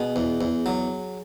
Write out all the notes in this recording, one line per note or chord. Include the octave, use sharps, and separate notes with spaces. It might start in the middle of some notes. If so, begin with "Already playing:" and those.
Already playing: B2 G#4
E2
E2
F#3